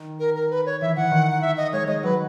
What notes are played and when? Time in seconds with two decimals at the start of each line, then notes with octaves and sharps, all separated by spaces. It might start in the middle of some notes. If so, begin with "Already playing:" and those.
Already playing: D#3
0.19 A#4
0.35 A#4
0.50 B4
0.66 C#5
0.81 E3 E5
0.96 E3 F#5
1.11 D#3
1.31 F#5
1.41 E5
1.57 D#5
1.73 G#3 C#5
1.87 G#3 D#5
2.03 F#3 B4